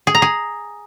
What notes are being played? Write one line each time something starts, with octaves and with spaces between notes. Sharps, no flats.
G#4
A#5
G#4